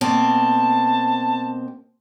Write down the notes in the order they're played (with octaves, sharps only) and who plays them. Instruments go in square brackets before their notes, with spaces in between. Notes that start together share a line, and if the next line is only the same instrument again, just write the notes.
[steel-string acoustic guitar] B2 A#3 C4 [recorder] A5